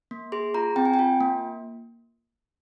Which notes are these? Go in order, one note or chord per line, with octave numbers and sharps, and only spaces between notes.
A#3
G#4 C6
F4 A#5
C4 G5
G#5
G5
F4
A#3